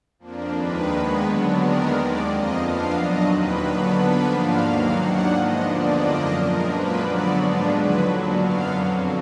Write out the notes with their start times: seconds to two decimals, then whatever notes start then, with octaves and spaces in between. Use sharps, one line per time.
0.19 F2 F3 A#3 D4
0.52 D#2 D#3 G#3 D4 B4
0.86 D#2 D#3 G#3 B3
1.21 D3 F#3 B3 D4
1.54 D#2 D#3 G#3 B3 D4 A#4
1.88 D#2 D#3 G#3 D5
2.22 F2 F3 A#3 D#5
2.56 F2 F3 B3 D4 F5
2.91 A#2 F#3 D4 D#5
3.24 D#2 D#3 A#3 B4
3.58 D3 F#3 B3 D4
3.92 D3 F3 B3 D4 B4
4.26 G#2 F3 A#3 D4 F5
4.60 D#2 D#3 F#3 A#3
4.94 D#2 D#3 A#3 D4 F#5
5.28 G#2 F3 B3 D#5
5.61 D#2 D3 F3 A#3 D4 D5
5.96 F#2 F3 A#3 D4 D#5
6.30 A#2 F3 G#3 A#4
6.63 F#2 F3 A#3 D4 B4
6.97 D3 F#3 B3 D5
7.32 G#2 F3 G#3 B3 D4
7.66 D#2 D3 F#3 B4
8.00 A#2 F#3 D4
8.34 F#2 D3 F#3 B3 F5
8.68 F2 D3 F#3